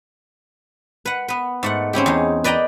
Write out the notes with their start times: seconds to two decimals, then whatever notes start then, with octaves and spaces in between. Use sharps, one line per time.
1.05 B4 F#5
1.28 B3 B4
1.63 G#2 A3 F#5
1.93 C4 C#4 E4 G4
2.06 E2 D#4 G#4
2.44 B4 D5 D#5 G5 A#5